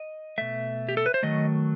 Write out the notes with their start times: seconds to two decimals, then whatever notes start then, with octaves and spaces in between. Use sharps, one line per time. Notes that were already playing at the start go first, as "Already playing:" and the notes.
Already playing: D#5
0.38 B2 A3 E5
0.89 G4
0.97 A4
1.06 B4
1.14 C5
1.23 D#3 F#3 A3 D#5